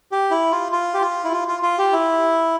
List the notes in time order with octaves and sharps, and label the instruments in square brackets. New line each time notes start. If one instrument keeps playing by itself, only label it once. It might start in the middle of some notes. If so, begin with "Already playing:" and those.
[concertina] G4
E4
F4
F4
G4
F4
E4
F4
F4
F4
G4
E4